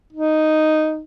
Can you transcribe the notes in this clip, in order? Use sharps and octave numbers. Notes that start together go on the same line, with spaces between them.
D#4